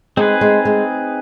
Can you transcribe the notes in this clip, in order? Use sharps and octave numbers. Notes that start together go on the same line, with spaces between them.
G#3 C4 D#4 G#4 B4
G#3
G#3